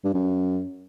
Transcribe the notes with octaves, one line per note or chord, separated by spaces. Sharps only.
G2
F#2